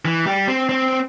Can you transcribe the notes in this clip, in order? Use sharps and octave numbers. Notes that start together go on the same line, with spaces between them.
E3
G3
C4
C4